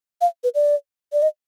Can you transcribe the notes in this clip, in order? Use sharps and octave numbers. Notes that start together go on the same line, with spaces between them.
F5
B4
D5
D5
D#5